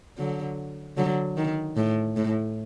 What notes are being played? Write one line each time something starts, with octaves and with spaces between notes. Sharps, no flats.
D3 F#3
D3 F#3
D#3
A2
A2